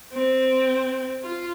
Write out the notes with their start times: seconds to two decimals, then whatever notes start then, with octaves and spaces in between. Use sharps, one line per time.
0.13 C4
1.23 F4